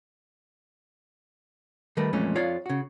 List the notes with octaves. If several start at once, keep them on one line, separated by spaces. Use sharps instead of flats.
D#3 G3 A3 A#4 B4
F2 A#2 E3 G#3 A3 C#4
F2 F4 C#5 D5 F5
C#3 F#4